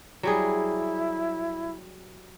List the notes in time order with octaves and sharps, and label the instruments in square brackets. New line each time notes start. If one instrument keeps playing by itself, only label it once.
[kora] F#3 G3 G#4 [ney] E4